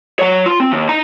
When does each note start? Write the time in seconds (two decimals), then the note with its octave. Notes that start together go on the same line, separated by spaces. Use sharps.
0.19 F#3 C#5
0.46 F4
0.60 C4
0.71 D#2
0.89 D#4 A#5